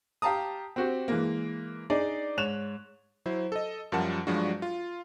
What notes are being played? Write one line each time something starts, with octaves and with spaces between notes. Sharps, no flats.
G4 F5 A5 A#5 D#6
C4 F#4 G4
E3 G#3 A#3
D4 D#4 G#4 D5
G#2 C#5 F#6 E7 F7
F#3 E4 C5
A4 D#5
F#2 F3 G3 A#4 F#5 A5
G2 F3 F#3 G#3 D4 F#4
F4